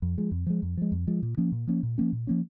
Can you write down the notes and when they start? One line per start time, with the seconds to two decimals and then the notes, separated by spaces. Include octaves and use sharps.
0.02 F2
0.17 F3 G#3
0.31 F2
0.46 F3 G#3
0.62 F2
0.77 F3 G#3
0.92 F2
1.07 F3 G#3
1.22 A#2
1.37 F3 A#3 C#4
1.52 A#2
1.67 F3 A#3 C#4
1.83 A#2
1.98 F3 A#3 C#4
2.13 A#2
2.27 F3 A#3 C#4